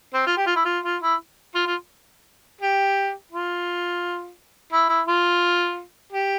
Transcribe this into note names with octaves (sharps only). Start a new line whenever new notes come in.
C4
F4
G4
F4
E4
F4
F4
E4
F4
F4
G4
F4
E4
E4
F4
G4